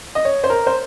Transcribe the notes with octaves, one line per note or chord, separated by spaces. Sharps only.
D#5
C#5
C5
A#4
C5